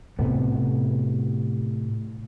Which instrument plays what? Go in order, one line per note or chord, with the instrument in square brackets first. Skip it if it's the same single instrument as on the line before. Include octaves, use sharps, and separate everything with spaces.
[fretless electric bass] A2 C3 A3 B3